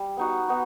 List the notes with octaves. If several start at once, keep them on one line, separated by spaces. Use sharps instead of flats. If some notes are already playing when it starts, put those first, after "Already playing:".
Already playing: G3
B3 D#4 F#4
B3 D#4 F#4